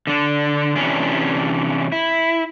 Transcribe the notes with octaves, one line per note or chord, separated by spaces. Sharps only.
D3 D4
C3 E3 F3 C#4 D4
E4